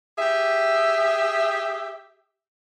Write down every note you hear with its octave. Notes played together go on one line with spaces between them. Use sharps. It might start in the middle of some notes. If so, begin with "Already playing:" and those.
G4 G#4 E5